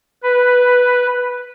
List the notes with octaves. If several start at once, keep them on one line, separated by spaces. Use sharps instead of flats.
B4